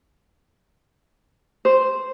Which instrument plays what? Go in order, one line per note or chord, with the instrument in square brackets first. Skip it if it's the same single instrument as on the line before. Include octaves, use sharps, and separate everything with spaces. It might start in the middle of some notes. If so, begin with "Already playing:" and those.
[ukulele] C5